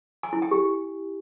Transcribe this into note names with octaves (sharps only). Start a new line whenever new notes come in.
G#5
E4
G5
G4